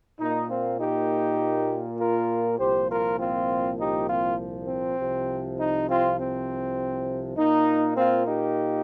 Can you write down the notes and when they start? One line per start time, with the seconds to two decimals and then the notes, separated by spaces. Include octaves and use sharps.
0.19 A#2 A#3 D#4
0.49 C4 F4
0.79 D#4 G4
1.99 F4 A#4
2.59 C2 A#2 F3 A#3 G4 C5
2.89 F4 A#4
3.18 C4 F4
3.78 D#4 G4
4.08 C4 F4
4.68 C4
4.98 C2 C3 F3
5.58 D#4
5.88 C4 F4
6.18 C4
7.37 A#2 A#3 D#4
7.97 C4 F4
8.27 D#4 G4